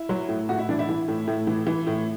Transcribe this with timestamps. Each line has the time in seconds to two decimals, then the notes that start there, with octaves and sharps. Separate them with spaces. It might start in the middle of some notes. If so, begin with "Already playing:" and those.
Already playing: E4
0.09 F#3
0.29 A2
0.49 A2 F#4
0.59 E4
0.69 E3 D4
0.79 E4
0.89 E3
1.08 A2
1.27 A2
1.47 E3
1.67 E3
1.87 A2